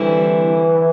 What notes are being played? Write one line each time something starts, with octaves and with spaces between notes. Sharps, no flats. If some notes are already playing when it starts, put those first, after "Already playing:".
Already playing: D3 E3 G3 C4 E4